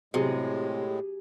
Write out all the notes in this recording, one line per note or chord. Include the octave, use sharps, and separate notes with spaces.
A2 C3 F#3 G#3 G#4